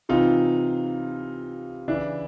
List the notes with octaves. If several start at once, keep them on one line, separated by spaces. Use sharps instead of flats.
C3 E3 D#4 F4
C#3 E3 D4 E4